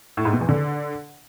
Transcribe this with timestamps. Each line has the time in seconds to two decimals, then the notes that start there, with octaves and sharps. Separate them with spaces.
0.17 A2
0.25 G#2
0.33 B2
0.41 E2
0.49 D3